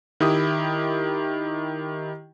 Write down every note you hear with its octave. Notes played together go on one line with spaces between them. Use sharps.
D#3 E4 G4 D#6